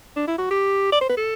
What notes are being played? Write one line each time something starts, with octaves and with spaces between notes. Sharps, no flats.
D4
E4
F#4
G4
D5
C5
B4
A4